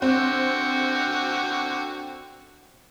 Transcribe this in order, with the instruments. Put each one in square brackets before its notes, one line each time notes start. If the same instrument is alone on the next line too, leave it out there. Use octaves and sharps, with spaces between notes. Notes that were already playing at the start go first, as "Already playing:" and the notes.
[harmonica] D3 F#4 G5 [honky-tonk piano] C4